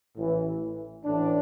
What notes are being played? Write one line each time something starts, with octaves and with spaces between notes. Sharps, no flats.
A1 A2 E3
A1 A2 E3 D4